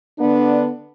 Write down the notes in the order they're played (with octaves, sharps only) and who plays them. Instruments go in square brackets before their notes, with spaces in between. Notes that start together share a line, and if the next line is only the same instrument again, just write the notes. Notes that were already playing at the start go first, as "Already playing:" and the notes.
[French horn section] D3 B3 D4